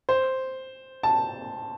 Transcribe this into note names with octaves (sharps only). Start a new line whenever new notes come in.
C5
A5